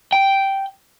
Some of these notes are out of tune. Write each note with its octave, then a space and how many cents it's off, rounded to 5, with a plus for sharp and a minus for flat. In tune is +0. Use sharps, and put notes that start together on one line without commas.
G5 -5